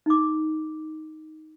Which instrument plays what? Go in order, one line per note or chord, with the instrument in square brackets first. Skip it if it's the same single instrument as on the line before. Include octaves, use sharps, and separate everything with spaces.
[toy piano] D#4 D6